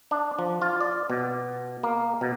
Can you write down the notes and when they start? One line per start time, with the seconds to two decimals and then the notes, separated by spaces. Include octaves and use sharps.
0.11 D4
0.39 F3
0.61 F4
0.81 D5
1.10 B2
1.83 A#3
2.21 B2